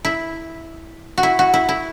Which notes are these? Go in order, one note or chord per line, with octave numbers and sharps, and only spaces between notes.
E4
F#4
E4
F#4
E4
E4